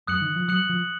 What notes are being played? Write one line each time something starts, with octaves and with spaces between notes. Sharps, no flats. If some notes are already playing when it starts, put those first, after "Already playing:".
F#2 D#6 F#6 C#7 F#7
D#3
F3
F#3 D#6 F#6 C#7 F#7
F3